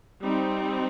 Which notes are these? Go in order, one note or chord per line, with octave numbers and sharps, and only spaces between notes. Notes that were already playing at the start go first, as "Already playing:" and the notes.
G3 C4 D#4